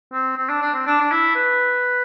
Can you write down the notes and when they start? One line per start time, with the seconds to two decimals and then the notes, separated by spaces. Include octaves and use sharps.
0.12 C4
0.37 C4
0.49 D4
0.62 D4
0.74 C4
0.86 D4
1.00 D4
1.11 E4
1.35 B4